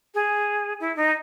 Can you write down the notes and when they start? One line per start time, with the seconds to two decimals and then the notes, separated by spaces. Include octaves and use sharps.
0.14 G#4
0.80 E4
0.96 D#4